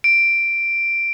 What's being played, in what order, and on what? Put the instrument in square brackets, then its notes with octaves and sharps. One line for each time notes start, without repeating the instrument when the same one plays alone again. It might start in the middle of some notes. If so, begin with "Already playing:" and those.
[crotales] D7